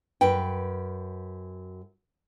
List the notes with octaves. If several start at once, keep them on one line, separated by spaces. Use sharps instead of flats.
F#2 B4 G5